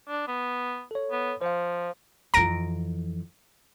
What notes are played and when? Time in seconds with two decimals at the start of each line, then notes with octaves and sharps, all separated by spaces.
0.09 D4
0.28 B3
0.91 A4 C#5
1.12 B3
1.41 F3 C5 F5
2.34 F2 E3 A#5 A#6 D7